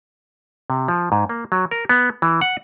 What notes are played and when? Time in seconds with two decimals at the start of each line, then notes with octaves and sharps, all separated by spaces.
0.70 C3
0.88 F3
1.12 G#2
1.29 A#3
1.52 F#3
1.71 A#4
1.89 B3
2.22 E3
2.41 F#5